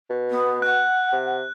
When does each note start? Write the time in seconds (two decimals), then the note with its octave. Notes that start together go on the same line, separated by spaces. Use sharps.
0.10 B2
0.30 B3
0.62 F#5 F#6
1.12 C3